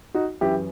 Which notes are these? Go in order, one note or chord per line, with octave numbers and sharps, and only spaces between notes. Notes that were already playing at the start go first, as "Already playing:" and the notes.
D#4 F#4
F#2 E3 E4 G4